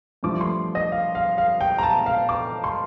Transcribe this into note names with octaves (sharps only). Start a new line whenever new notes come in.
G2 F3 A3 D6
C6
D#5
F5
F5
F5
G5
A#5
A5
F5
D6
C6